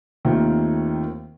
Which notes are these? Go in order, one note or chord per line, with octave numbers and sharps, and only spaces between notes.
D#2 D#3 A3 C4 F4